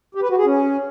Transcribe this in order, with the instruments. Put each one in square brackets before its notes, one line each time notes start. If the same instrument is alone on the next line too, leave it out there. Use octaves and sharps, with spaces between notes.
[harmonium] G4
B4
F#4
G#4
C#4